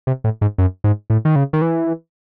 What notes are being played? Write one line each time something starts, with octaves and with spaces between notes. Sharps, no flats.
C3
A2
G#2
F#2
G#2
A2
D#3
C#3
D#3
E3